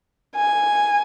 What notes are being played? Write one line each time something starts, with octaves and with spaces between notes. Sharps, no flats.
G#5